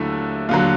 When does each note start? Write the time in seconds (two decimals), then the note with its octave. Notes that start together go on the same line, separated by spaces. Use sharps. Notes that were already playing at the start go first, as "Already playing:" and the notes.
Already playing: D#2 D3 F#3 A3 E4
0.49 D#2 D3 F#3 F4